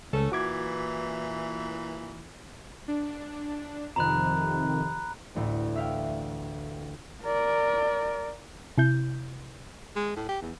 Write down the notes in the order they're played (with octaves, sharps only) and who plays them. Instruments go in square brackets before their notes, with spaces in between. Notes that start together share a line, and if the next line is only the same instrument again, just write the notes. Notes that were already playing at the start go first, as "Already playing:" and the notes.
[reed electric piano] C#2 [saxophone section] A3 C#4 A4
[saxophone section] A#2 E3 [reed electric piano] F#4 D6 G#6
[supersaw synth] D4
[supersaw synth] F2 C3 D#3 [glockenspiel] A#5 B5 F#6
[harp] A1 D2 A2
E5 F5 G5
[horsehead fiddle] A#4 D5
[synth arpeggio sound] C3 E4 G6
[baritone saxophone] G#3
A2
G4
E2